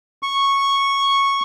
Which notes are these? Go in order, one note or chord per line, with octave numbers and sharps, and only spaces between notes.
C#6